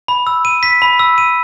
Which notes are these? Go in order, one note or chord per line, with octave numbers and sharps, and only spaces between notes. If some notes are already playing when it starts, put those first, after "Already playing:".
B5
E6
D#7
B6
B5
E6
D#7